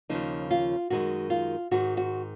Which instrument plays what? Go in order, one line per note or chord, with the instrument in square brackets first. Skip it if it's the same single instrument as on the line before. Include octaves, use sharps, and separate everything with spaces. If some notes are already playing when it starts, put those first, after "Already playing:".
[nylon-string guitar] D#2 C#3 F3 D#4
F4
F#2 D#3 G#3 F#4
F4
G#2 D#3 G#3 F#4
F#4